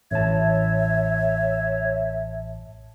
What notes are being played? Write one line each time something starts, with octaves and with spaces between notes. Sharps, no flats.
A1 C#5 E5 A5